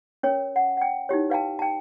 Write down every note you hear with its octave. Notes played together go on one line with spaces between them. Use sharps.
C#4 A#4 C#5 G5
F#5
F#5 G5
D#4 E4 G4 C#5
B4 F5 G5 A5
G5 A5